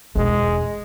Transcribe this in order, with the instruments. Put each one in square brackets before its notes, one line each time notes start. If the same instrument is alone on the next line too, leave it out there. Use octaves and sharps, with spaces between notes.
[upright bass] E1 D#3 [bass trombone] G#3